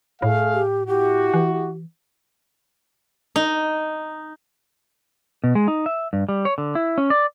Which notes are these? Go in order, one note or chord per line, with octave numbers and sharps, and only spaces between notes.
A2 A3 G#4 F5
G4
E4 F#4 G4
E3
D#4
B2
G#3
D#4
E5
G2
G3
C#5
D3
E4
C#4
D5